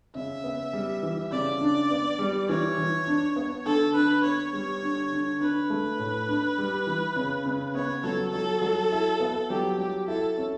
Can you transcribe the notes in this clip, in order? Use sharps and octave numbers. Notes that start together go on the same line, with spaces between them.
C#3 E5
B3
G3
E3
C#3 D5
D4
B3
G3
E3 C#5
E3
D4
B3
D3 A4
D4 B4
B3 C#5
G3
D3
D3
D4 B4
A3
A2
D4
G3
E3
C#3
C#3
B3 C#5
F#3 A4
F#3 A4
F#3
E4
B3
F#3 G4
F#3 G4
E4 A4
C#4